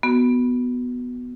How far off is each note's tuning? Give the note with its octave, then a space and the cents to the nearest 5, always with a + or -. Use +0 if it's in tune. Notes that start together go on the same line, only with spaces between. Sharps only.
B3 +0 F#4 +10